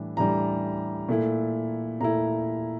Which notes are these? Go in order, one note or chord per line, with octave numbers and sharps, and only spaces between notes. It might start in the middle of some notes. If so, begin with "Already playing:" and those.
Already playing: A2 E3 G3 D4
A2 E3 G3 D4 A#5
A#2 A3 E4
A#2 A3 E4 A#5